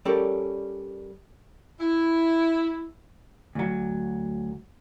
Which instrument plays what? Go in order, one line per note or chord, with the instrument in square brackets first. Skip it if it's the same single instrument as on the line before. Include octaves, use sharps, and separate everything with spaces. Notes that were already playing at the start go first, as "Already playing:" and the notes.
[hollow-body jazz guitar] G3 C#4 A4 A#4 D5
[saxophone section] E4
[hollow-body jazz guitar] D2 F#3